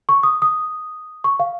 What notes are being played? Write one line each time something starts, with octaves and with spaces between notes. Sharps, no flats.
C#6
D#6
D#6
C#6
F5